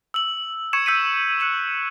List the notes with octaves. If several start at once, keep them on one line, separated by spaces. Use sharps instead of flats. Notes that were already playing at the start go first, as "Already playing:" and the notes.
E6 F#7
C#6 G#6 C#7 E7
E6 G6 B6 C#7 D#7
F#6 C#7 E7 F#7